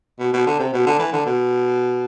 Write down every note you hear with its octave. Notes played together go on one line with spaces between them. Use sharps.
B2
B2
D3
C3
B2
D3
E3
D3
B2